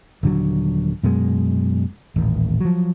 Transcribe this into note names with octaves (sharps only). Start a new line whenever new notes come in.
D#1 D3 F#3
F#2 B2 G#3
D#1 A1
F3 F#3